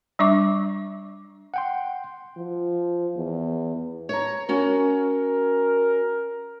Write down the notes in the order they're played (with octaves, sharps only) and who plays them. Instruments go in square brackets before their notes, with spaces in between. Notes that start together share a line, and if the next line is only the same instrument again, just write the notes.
[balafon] G3 D4 E5 C#6 D6
[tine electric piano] F#5 G5 C6
[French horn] F3
E2
[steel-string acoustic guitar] C#5 A#5
[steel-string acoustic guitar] C#4 F#4 [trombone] A#4